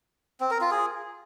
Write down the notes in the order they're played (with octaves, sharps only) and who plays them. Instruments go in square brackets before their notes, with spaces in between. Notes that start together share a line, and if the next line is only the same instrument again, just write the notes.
[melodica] C4
A#4
F4
G#4